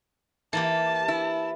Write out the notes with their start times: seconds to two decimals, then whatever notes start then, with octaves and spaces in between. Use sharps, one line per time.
0.53 E3 A#3 G4 A5
1.08 E4